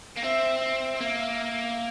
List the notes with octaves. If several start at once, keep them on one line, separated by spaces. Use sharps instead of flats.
A#3
C4 E5
E5
A#3